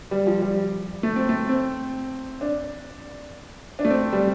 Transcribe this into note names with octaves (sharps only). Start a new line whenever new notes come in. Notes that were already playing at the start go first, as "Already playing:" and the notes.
G3
F3
G3
A3
C4
A3
C4
D4
D4
A3
C4
G3